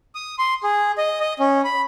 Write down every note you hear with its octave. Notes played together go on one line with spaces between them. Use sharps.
D#6
C6
G#4
D#5
D#5
C#4
B5